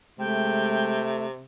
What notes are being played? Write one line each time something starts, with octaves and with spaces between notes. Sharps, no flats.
C3 G#3 A3 G5